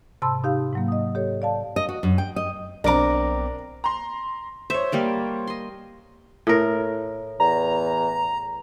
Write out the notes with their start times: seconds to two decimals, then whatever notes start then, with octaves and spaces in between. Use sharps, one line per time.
0.22 G#2 C3 A5 B5 C6 E6
0.44 D#4 G4 F5
0.73 G#2 F#3 A#3
0.88 D#5 D#6
1.15 G4 A4 C#5
1.42 D5 F5 A5
1.76 D#5
1.89 F#4
2.03 F#2
2.18 G5
2.36 D#5
2.84 B1 B3 C4 D4 A#4 A#5 D6
3.84 A#5 C6
4.70 C5 C#5 E5
4.92 G3 A#3 D5
5.47 D#5 C6
6.47 A2 A#4
7.40 E2 A#5